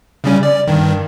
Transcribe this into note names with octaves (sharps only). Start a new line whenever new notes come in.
C#3 G3 C#4
D5
G2 D#3